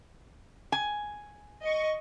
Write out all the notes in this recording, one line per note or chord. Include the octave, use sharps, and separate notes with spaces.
G#5
D#5 C#6